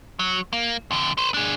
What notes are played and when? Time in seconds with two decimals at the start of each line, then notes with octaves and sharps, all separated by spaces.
0.19 F#3
0.53 A#3
0.91 F2 D3
1.18 B4 C5
1.34 D4 G#4